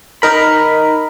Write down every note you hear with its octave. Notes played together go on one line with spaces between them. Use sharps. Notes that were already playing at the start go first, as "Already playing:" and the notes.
D#4 A#4 B5